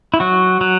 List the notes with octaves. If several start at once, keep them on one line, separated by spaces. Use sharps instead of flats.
E4
F#3 F#4
F#3